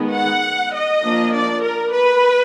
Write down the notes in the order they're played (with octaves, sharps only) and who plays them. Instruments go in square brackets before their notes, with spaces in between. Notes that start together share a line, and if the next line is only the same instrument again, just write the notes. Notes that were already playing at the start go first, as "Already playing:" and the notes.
Already playing: [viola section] D#3 G#3 B3
F#5
D#5
F3 A#3 D4
D5
A#4
B4